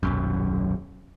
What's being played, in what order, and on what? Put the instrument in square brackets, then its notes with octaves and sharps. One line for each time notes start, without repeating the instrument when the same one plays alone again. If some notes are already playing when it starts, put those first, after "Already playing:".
[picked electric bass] D#1 B1 F#2